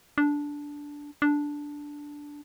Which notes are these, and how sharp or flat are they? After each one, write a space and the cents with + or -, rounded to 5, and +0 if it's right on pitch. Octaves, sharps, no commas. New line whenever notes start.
D4 -10
D4 -5